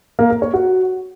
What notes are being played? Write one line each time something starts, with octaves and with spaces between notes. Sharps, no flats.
A#3
A#4
C#5
F#4